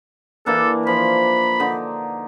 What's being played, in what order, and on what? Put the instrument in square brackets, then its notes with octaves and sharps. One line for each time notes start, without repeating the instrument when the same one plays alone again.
[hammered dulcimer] E3 A#3 D4 [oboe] A4
[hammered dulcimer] F3 [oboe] B5
[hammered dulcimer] D3 D#4